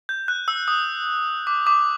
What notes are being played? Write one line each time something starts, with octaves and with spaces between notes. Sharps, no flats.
G6
F#6
E6
D#6
D6
D6